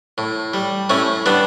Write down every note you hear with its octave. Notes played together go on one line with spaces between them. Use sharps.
A2
G3
A2 A3 C#4
G3 B3 D4